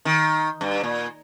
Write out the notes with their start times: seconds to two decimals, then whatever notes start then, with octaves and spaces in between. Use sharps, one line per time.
0.05 D#3
0.61 G2
0.83 A#2